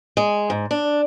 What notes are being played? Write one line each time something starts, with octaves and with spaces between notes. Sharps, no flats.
G#3
G#2
D4